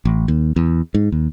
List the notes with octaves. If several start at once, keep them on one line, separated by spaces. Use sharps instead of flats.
A1
D#2
E2
G#2
D#2